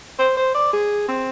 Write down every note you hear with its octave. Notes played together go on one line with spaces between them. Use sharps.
C5
C5
D5
G#4
C4